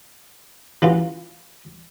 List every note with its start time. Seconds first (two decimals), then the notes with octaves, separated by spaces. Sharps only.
0.82 E3 C#4 F4